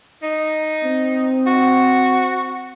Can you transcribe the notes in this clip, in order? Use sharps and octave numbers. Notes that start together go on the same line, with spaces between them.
D#4
C4
F#4